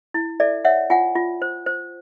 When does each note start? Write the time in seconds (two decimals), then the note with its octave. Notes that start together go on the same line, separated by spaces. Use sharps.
0.14 E4
0.40 A4 D5 E5
0.65 C#5 E5 F#5
0.90 F4 F#5 G#5
1.15 F4
1.42 C5
1.66 C5